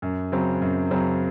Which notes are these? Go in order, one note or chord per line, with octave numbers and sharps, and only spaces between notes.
F#2
C#3 F#3 C4
F#2
C#3 F#3 C4